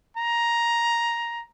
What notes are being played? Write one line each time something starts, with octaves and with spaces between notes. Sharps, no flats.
A#5